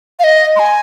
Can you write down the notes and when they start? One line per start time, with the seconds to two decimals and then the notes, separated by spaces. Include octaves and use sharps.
0.19 F5
0.24 D#5
0.56 C6
0.59 G#5